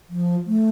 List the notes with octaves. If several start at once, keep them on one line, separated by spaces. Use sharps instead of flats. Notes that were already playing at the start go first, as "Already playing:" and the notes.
F3
A3